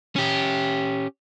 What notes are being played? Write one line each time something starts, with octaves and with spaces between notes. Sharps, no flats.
C#4 G4